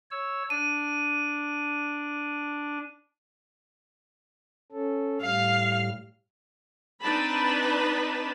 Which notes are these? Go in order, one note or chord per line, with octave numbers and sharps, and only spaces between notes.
C#5 E6
D4 D#7
C#4 A4
A2 G3 F5 F6
C4 D4 D#4 B4 A5 B5